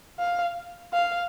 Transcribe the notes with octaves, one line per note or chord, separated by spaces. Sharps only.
F5
F5